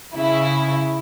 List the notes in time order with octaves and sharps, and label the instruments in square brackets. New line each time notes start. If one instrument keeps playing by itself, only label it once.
[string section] C#3 E4